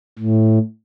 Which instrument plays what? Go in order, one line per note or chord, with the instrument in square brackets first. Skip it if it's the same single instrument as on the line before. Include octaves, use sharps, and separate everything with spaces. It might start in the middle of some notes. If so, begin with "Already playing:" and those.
[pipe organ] A2